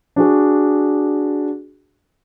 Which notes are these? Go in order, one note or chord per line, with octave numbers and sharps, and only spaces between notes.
D4 F#4 G#4